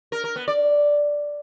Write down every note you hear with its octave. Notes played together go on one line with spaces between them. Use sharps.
A#4
A#4
B3
D5